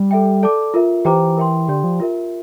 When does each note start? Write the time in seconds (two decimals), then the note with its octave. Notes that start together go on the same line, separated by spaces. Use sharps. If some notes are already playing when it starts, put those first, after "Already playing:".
Already playing: G3
0.11 A4 E5 G5
0.43 A4 D5 A5 D6
0.74 F4 A#4 E5
1.05 E3 G4 C5 G5 A#5 D6
1.37 A#4 E5 G5 C6
1.68 D3 G4 D5 G5 C6
1.84 F3
2.00 F4 A#4 E5